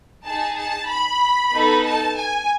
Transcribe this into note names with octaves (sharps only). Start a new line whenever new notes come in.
D#4 G#4 A5
A5
B5
B3 D#4 A4
A5
G#5